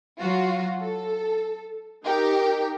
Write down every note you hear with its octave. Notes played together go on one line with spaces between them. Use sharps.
F#3 F4 F#4
A4
D#4 G4 A#4